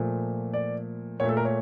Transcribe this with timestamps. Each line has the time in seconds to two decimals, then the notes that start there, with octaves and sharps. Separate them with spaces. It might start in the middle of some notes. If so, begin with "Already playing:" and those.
Already playing: A#2 F3 A3
0.53 D5
1.20 A#2 A3 C#5
1.29 A4
1.37 A#4
1.45 C#5